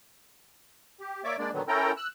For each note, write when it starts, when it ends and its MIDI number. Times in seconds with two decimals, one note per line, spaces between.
1.00 1.22 67
1.24 1.36 58
1.24 1.36 73
1.24 1.36 74
1.24 1.36 76
1.24 1.36 86
1.39 1.51 56
1.39 1.51 58
1.39 1.51 62
1.39 1.51 74
1.53 1.62 46
1.53 1.62 50
1.53 1.62 51
1.53 1.62 54
1.53 1.62 59
1.68 1.92 61
1.68 1.92 64
1.68 1.92 69
1.68 1.92 70
1.68 1.92 79
1.68 1.92 82
1.97 2.07 88
1.97 2.07 90